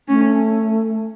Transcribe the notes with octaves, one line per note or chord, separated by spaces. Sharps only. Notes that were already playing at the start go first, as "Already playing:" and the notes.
A3 C#4